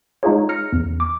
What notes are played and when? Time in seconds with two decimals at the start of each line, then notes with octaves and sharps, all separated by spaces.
0.23 G#3 D#4 F4 G#4 C#5
0.49 F6 A#6 C#7
0.72 E2
1.00 D6